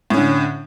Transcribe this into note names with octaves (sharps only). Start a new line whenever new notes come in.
A2 D3 C#4